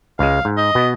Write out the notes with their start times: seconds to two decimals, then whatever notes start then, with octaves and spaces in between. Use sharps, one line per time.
0.19 C#2 G#3 F5
0.45 G#2
0.57 D#5
0.75 B2 B3